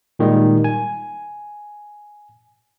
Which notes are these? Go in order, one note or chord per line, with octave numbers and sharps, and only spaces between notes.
A#2 D#3 G3 G#3
G#5